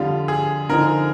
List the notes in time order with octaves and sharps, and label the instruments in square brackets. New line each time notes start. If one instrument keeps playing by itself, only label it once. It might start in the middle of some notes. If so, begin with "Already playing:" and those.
Already playing: [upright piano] F2 D3 G3 [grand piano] F4
[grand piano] G#4
[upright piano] D3 F3 C4 D#4 [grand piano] A#4